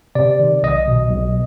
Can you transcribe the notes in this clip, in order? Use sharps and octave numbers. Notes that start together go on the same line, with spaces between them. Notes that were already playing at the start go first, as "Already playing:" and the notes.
C3 D5
D#3
B1 D#5
B2
B1